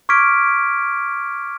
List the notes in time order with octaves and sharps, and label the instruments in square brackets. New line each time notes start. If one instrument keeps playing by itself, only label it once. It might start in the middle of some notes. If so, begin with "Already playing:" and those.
[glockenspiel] C#6 D6 F6 G#6 B6 D7